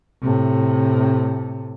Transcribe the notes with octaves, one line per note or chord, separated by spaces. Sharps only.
A2 C3